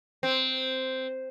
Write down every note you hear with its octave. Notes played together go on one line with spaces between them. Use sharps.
C4